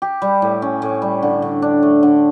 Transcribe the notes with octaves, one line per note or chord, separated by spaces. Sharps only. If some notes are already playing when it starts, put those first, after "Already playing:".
G4
G3
A2
C#4
A2
G3
D3
D3
D4
A3
D3